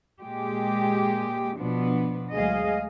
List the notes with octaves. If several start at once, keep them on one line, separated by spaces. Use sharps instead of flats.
A#2 G#3 G4
B2 F3 B3 D4
D2 F#3 G#3 G#4 D#5 F5